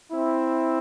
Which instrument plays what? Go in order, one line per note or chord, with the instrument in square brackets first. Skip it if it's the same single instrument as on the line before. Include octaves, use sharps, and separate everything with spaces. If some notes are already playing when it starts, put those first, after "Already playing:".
[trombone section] C4 E4